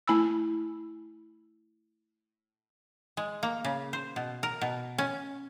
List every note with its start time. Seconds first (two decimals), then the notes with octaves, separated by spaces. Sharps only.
0.08 A3 E4 G#5 B5 E6
3.17 G#3
3.43 A#3
3.64 C#3
3.93 C5
4.16 B2
4.43 A#4
4.61 B2
4.98 C#4